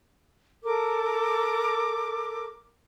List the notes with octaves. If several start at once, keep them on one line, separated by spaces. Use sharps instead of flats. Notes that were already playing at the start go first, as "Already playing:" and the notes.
A4 A#4 D6